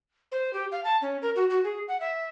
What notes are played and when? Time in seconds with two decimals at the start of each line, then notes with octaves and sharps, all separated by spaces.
0.32 C5
0.53 G4
0.72 F5
0.84 A5
1.02 C#4
1.22 A#4
1.36 F#4
1.50 F#4
1.64 G#4
1.88 F#5
2.00 E5